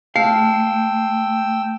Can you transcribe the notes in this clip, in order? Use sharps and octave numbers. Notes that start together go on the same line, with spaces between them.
A3 F5 G5 E6